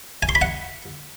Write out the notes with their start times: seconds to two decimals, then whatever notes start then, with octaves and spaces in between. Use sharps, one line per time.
0.23 G#5
0.29 C6
0.35 B5
0.42 F#5